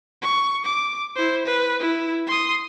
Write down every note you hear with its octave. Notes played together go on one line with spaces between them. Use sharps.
C#6
D6
E4 C5
B4
E4
C6 D#6